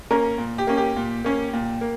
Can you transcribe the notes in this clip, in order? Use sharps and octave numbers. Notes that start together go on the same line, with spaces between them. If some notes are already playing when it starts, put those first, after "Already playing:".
A#3 C#4 A#4
A#2
G4
A#3 C#4
G4
A#2
A#3 C#4
A#2
A#3